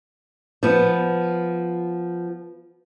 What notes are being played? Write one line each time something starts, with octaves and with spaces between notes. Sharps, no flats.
F3 B3